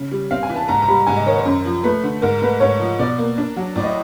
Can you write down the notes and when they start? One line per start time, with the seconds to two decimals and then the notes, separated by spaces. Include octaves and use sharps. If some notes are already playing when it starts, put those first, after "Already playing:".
Already playing: C#3
0.11 G3
0.31 C4 F5
0.43 G#5
0.49 E3
0.56 A5
0.68 G#2 A#5
0.82 A#5
0.88 G3 B5
1.07 G#2 G#5
1.17 D#5
1.26 D#3 C#5
1.36 C5
1.45 F#2
1.65 F3
1.83 A3 B4
2.03 D3
2.22 G#2 A#4
2.42 A3 B4
2.60 G#2 C#5
2.80 F3
2.99 B2 D5
3.18 A#3
3.38 D4
3.56 F#3
3.75 A2 D5
3.84 D#5